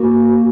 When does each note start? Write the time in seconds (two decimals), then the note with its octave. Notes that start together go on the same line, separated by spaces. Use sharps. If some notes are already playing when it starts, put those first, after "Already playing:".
Already playing: A#3 F#4